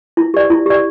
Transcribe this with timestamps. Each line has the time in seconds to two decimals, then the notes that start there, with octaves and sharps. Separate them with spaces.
0.17 E4
0.34 G4 D5
0.50 E4
0.66 G4 D5